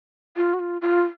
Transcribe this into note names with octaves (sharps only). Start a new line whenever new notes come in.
F4
F#4
F4
F4